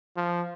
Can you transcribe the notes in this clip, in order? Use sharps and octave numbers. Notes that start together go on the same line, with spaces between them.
F3